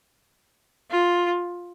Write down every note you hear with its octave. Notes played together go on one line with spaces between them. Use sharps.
F4